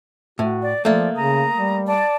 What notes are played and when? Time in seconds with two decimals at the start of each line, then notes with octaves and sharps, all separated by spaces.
0.39 A2 F#4
0.63 D5
0.85 F3 A3 A#3 D5
1.15 C#3 A#5 D#6
1.57 G3
1.88 D5 A5